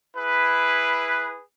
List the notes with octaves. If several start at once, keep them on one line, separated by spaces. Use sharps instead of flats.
E4 G#4 B4